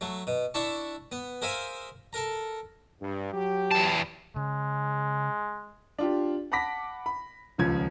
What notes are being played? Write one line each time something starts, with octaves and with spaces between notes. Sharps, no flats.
F#3 A3
B2
D4 E4 E5 A5 C#6
B3
G#4 A#4 C5 E5 F5 G#5
A4 A#4 A#5
G2
F#3 G4
E2 A5
C#3 G#3
D4 F4 G4
F#5 A5 B5 D6 A#6 B6
B5
D#1 C#2 F3 G#6